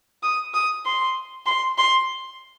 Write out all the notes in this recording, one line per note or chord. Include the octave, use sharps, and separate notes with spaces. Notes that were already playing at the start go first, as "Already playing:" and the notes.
D#6
D#6
C6
C6
C6